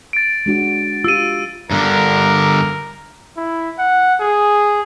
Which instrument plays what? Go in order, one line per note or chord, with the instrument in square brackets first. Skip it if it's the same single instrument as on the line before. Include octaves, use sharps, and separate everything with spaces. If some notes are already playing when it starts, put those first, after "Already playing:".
[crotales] A6 D7
[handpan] G#3 D4 F#4
[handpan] F4 G4 [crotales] E6 D#7
[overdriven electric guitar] G2 D3 [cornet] A#4
[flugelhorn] E4
F#5
G#4